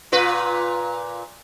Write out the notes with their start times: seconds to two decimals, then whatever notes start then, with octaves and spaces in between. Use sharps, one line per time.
0.12 A#2 F4 B4